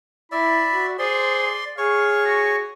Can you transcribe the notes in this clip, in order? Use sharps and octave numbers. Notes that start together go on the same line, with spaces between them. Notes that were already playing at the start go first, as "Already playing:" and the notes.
E4 D5 E5 B5
F#4
G#4 C5 D5 C6
G#4 C#5 F5 C#6
F#4